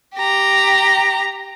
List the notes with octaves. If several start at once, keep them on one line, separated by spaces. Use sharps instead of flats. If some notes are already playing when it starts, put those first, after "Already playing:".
G4 A#5